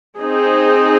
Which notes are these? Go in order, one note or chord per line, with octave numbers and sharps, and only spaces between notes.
C4 D#4 G#4